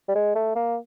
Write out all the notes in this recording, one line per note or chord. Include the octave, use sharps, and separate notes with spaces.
G3
G#3
A3
A#3